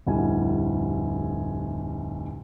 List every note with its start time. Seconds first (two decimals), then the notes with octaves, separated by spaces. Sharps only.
0.07 F1 D2 A2 G3 G#5